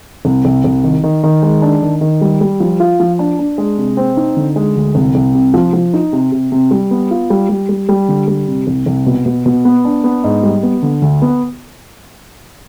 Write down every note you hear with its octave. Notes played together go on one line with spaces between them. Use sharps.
C2
C2
C2
D#3
D#3
D#3
G#3
D4
D#3
D#3
G3
G3
F3
F4
F3
D4
D4
G#3
C3
C4
D#4
D3
G#3
D2
C2
C2
C3
F3
F3
D#4
C3
C3
C3
G3
B3
F4
G3
G3
G3
G3
D3
G3
C3
C2
C2
B2
B2
B2
B3
D4
B3
G#2
G3
B3
D3
D2
B3